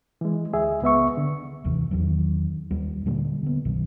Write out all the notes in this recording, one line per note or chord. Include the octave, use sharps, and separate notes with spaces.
E3 G#3
D2 G#3 G#4 E5
C#2 B3 E5 C#6
D3
G1 D#2 C3 E3
E2 D#3 F#3
D#2 G3
A#2 D3 G3 A#3
D3 B3
B1 F#2 B2 D#3